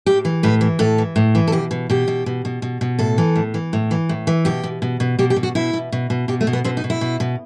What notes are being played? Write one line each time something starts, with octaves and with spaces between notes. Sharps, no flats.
A2 G4
E3
A2 B4
E3
A2 A4
E3
A2
E3
A4
B2 G4
B2
B2 G4
B2
B2
B2
B2
B2
A2 A4
E3
A2
E3
A2
E3
A2
E3
B2 G4
B2
B2
B2
B2 G4
G4
B2
F#4
B2 E4
B2
B2
B2
B2 G4
A3
B2
B3
B2 C4
D#4
B2
E4
B2
B2